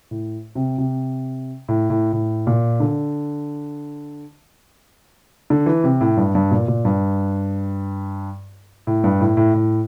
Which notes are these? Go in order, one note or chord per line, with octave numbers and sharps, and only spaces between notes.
A2
C3
C3
A2
A2
A2
A#2
D3
D3
E3
C3
A2
G2
G2
A#2
A#2
G2
A2
G2
A2
A2
A2